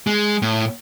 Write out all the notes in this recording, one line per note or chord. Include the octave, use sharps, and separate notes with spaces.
G#3
A2